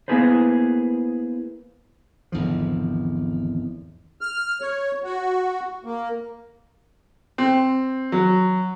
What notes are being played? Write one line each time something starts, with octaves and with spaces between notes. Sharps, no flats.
A#3 B3 E4 G#4 B4 C5
G#1 E2 D3 F3
F6
C#5
F#4
A#3
C4
F#3